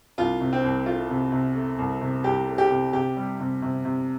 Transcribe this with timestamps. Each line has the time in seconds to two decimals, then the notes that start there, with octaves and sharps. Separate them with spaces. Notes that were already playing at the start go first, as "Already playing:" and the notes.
0.18 C2 F4
0.40 C3
0.53 C4
0.64 C2
0.86 A3 F4
1.10 C3
1.32 C3
1.55 A3
1.79 C2
2.01 C3
2.24 C2 G4
2.47 A3
2.58 G4
2.70 C3
2.93 C3 G4
3.17 G3
3.40 C3
3.62 C3
3.85 C3